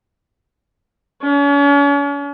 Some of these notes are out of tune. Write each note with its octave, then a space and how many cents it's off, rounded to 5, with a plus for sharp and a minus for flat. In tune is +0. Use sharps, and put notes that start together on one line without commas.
C#4 +40